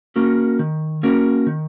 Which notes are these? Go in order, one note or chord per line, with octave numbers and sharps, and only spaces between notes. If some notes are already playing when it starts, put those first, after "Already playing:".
A#3 C#4 F#4 A#4
D#3
A#3 C#4 F#4 A#4
D#3